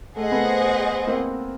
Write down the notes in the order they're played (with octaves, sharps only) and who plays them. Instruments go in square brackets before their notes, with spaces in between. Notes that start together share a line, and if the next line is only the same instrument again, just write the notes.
[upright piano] A3 [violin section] G#4 C5 D#5 F#5
[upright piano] A3 B3
A#3 C4